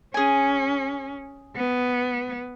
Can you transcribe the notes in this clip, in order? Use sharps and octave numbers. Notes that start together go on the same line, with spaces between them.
C#4 G#4 G#5
B3